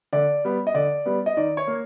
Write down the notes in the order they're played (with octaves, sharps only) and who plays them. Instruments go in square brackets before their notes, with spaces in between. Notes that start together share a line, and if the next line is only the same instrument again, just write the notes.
[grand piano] D3 D5
G3 B3
D#5
D3 D5
G3 B3
D#5
D#3 D5
C#5
A#3